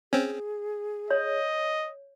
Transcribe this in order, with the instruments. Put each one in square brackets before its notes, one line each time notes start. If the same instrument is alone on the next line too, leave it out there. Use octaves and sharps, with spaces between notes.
[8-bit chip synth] C4 C#4 [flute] G#4
[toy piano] C#5 [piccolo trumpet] D#5